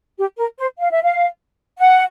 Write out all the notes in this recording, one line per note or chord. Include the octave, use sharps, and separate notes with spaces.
G4
A#4
C5
F5
E5
F5
F#5